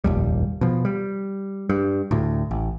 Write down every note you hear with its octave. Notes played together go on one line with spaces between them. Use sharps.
F1 A#1 D#2 G3
B2 F3
G3
G2
D2 A2
A1